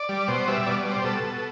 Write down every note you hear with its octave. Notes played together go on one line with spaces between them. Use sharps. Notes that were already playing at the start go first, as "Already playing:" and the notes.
Already playing: D5
G3
B2 C5
G3 E5
B2 D5
D5
G3
C5
B2 A4
B2